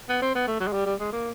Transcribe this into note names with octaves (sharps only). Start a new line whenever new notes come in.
B3
C4
B3
A3
F#3
G#3
G3
G3
G#3
A#3